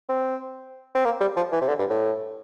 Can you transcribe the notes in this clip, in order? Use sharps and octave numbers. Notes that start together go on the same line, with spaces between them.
C4
C4
A#3
G3
F3
E3
C3
D3
G2
A2